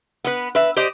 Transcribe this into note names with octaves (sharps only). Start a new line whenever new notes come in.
B3 B4
B4 E5
G4 C5 D5 D#5